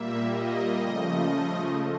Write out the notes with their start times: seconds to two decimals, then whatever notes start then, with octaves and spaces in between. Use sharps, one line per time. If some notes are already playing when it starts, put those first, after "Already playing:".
Already playing: A#2 G3 A#3 E5
0.30 D#5
0.79 C#3 F3 A3